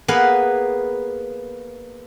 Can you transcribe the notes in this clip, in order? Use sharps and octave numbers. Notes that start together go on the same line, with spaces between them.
A#3 B3 G#4 B4 F5 F#5